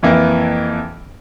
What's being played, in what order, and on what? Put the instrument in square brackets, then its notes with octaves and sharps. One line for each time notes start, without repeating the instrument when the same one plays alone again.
[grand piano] F2 E3 A#3